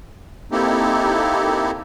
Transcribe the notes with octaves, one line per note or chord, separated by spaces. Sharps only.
A#3 C4 D#4 E4 G4 A4